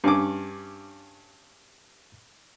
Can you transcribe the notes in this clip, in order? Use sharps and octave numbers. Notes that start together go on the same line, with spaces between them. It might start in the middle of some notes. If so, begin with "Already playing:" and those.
G2 C#4 D6